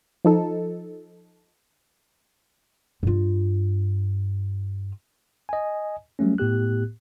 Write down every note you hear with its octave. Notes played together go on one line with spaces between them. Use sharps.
F3 D#4 A4
G2 F4
D#5 G#5
F#3 G3 A3 C#4
A2 B3 G4 F#6